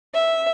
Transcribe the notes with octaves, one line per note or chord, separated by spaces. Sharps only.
E5